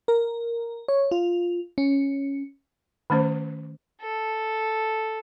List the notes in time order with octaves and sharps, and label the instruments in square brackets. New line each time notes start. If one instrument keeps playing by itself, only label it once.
[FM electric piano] A#4
C#5
F4
C#4
[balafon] D#3 A3 C#4 C5
[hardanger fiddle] A4